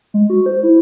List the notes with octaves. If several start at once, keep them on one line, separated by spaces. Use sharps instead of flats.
G#3
F#4
C5
E4